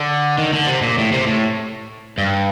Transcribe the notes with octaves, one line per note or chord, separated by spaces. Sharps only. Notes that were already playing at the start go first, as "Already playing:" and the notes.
Already playing: D3
D#3
D3
C3
A#2
A2
C3
A2
G2